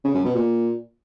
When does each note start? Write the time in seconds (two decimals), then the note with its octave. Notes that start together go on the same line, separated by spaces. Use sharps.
0.04 C#3
0.15 F#2
0.25 B2
0.35 A#2